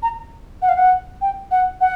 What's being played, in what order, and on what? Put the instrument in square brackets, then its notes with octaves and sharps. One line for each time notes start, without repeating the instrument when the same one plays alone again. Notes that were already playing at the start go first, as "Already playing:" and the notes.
[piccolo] A#5
F#5
F5
F#5
G5
F#5
F#5